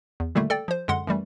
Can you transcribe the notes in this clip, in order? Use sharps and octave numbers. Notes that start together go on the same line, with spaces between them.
E2
A#2 D3 D#3 G3 A3 A#3
A4 D5 G5
F3 C5
F#2 D3 G#3 F#5 C6
F#2 E3 G3 A3